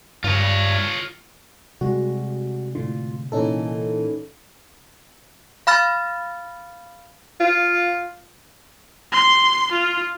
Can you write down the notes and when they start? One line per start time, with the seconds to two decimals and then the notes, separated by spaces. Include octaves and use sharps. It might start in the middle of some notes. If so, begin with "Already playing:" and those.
0.24 G2 F4 C#5
1.81 C3 G3 G#3 F#4
2.75 A2 D3 F4
3.32 A#2 E3 C#4 D#4 A4
5.67 F5 B5 F6 A6
7.40 F4
9.12 C6
9.72 F4